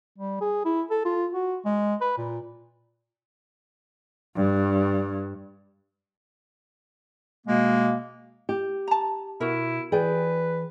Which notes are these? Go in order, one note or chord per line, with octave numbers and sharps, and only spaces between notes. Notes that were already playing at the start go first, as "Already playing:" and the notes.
G3
G#4
E4
A4
F4
F#4
G#3
B4
A#2
G2
B2 G#3 A#3
G4
A5 A#5
B2 E4 F#4 A#4
E3 G#4 B4 D5 G5